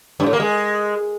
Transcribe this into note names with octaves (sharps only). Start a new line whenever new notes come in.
G2
A2
A#3
G#3